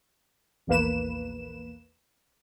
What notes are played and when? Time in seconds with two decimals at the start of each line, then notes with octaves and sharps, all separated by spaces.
0.67 A#1 E2 A#3 B4 E7